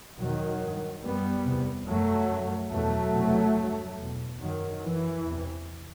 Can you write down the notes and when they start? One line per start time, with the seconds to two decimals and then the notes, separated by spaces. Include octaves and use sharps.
0.19 E2 B2 D#3 F#3
0.61 G2
1.03 F#2 G3 B3
1.45 E2 C3
1.87 F#2 F#3 A3
2.30 F#2
2.71 E2 B2 F#3 A3
3.14 E2 C3
3.57 G2
3.99 E2 B2
4.40 F#2 D#3 F#3
4.82 F#2 E3
5.25 E2 C3